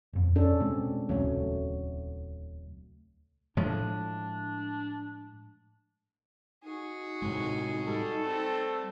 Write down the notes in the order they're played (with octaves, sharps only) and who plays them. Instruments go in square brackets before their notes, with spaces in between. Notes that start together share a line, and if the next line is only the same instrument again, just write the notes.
[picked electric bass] D#1 F2
[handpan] C#4 D4 A4
[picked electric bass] B2 G#3 [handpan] C4
[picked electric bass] D#1 C#2 C#4 [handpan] F#3 A3
[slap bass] A2 F3 G#3 [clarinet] D4
[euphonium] D#4 [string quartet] F#4 G#4
[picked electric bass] A2 C3 G#3
[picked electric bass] G3 [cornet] A4
[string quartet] A3 C4